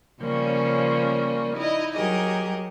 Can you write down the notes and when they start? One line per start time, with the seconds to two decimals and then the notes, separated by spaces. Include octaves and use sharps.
0.21 C#3 F3 G3 A#3 C#4
1.56 D#4 E4 D#5
1.95 F#3 G4 G#4 A#4 D#5